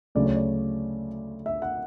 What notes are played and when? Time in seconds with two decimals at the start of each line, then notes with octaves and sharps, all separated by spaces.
0.15 D2 C#3 F#3 A3 D5
0.25 C#5
0.36 D5
1.46 E5
1.62 F#5